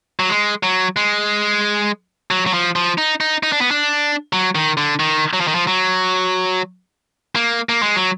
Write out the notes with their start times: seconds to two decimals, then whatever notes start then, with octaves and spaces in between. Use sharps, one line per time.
0.20 F#3
0.29 G#3
0.63 F#3
0.96 G#3
2.31 F#3
2.46 F#3
2.54 F3
2.76 F3
2.98 D#4
3.20 D#4
3.43 D#4
3.52 D4
3.61 B3
3.71 D4
4.33 F#3
4.55 D#3
4.77 D3
5.00 D#3
5.33 F#3
5.41 F3
5.47 D#3
5.55 F3
5.67 F#3
7.35 A#3
7.69 A#3
7.82 G#3
7.96 F#3